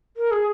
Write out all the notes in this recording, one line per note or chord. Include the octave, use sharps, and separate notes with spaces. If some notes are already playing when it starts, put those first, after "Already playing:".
A#4
G#4